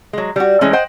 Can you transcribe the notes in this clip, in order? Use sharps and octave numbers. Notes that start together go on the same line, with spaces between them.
F#3 G#3
G3 F#4
E3 G#3 A3 C#4
C5 D#5 F#5 G5